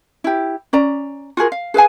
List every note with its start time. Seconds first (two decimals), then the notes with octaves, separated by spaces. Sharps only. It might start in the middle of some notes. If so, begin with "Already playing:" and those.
0.24 E4 G4
0.73 C#4 D5 A#5
1.37 F4 F#4 G#4 A#4
1.52 F5
1.74 G#4 B4 F5 G#5